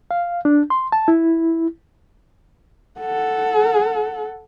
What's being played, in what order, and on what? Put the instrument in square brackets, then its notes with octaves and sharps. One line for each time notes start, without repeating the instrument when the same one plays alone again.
[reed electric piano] F5
D4
C6
A5
E4
[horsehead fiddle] A4 F#5